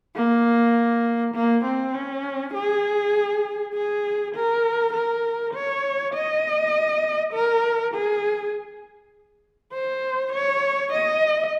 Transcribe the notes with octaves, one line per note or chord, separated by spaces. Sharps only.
A#3
A#3
C4
C#4
G#4
G#4
A#4
A#4
C#5
D#5
A#4
G#4
C5
C#5
D#5